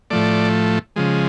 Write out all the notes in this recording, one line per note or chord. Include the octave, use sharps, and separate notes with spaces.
A2 F3 A3 D5
C#3 F3 G#3